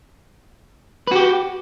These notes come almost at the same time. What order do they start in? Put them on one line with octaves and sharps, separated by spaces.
B4 F#4 G4